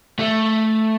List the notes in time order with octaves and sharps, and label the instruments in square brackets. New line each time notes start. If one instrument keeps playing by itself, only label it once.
[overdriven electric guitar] A3